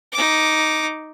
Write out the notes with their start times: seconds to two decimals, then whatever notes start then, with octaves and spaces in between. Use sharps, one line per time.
0.12 D#4 D6